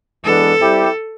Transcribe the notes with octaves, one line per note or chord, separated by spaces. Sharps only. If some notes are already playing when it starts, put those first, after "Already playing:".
E3 G#3 B3 D4 A4
G3 C4 E4 G4